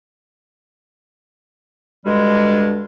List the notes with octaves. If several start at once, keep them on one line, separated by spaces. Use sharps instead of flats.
D2 G2 G3 G#3